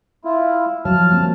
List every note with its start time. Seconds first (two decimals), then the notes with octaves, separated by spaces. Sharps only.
0.25 E4 F4
0.85 F3 F#3 C#5 A5 F6
1.10 G3 A#3 C4